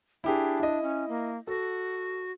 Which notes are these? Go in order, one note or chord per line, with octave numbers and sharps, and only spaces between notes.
D4 E4 G4 G#4
E4 D#5
C#4
A#3
F#4 A4